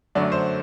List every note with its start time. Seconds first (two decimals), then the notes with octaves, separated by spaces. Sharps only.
0.15 F#2 D3 F#3 A3 D5
0.32 C5